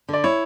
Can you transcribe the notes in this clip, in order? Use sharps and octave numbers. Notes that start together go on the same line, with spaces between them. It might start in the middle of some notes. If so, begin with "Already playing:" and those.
D3 D5
E4 C#5